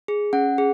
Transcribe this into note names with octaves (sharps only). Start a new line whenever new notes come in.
G#4
C#4 F#5
G#4